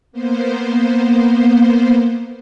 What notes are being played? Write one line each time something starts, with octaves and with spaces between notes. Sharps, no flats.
A#3 B3 C5